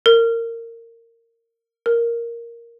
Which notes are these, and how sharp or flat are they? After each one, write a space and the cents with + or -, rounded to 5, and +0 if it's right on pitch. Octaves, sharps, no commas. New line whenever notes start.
A#4 -20
A#4 +0